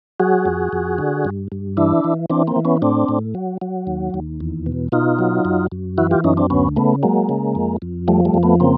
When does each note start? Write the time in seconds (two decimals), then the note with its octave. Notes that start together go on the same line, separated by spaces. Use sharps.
0.20 F#3 F#4 G#4
0.45 F2
0.73 F2
0.98 D3
1.25 G2
1.52 G2
1.77 E3 D4 E4
2.04 E3
2.30 E3 C4 D4
2.47 A#3 C4
2.56 E3
2.65 B3 C#4
2.82 A2 C4 D4
3.09 A2
3.35 F#3
3.62 F#3
3.87 D#2
4.14 D#2
4.40 E2
4.66 B2
4.92 B2 D#4 F4
5.19 F#3
5.45 F#2
5.72 F#2
5.98 E3 E4 F#4
6.11 F4 G4
6.24 F#2 C#4 D#4
6.37 C4 D4
6.50 D2 B3 C#4
6.76 C#3 A3 B3
7.03 F#3 G#3 A#3
7.29 C#3
7.55 F2
7.82 F2
8.08 F3 G3 A3
8.25 G3 A3
8.34 F2
8.43 A3 B3
8.60 C#3 A#3 C4